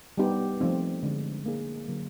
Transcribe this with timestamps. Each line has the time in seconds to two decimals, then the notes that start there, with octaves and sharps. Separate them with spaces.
0.17 G3 B3 D#4 G4
0.60 F3 A3 C4 D#4
1.03 D3 F3 G#3
1.46 A#3 D#4 G#4
1.88 D3 F#3 A#3